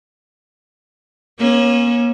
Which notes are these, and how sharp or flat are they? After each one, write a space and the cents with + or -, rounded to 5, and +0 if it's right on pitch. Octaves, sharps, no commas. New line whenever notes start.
A#3 +35 C#4 -20